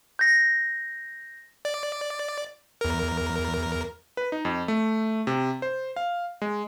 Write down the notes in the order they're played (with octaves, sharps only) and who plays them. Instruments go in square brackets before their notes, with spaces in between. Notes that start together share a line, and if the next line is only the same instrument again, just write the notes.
[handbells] G6 A#6
[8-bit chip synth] D5
E2 A#4
[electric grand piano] B4
D#4
F2
A3
C3
C5
F5
G#3